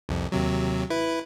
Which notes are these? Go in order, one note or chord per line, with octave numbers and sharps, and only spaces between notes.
C2 F2
D#2 C3 F#3
E4 B4